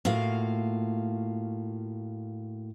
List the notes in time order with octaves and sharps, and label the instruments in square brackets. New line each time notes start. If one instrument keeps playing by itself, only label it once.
[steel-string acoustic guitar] A2 A#3 F4 F#4 F5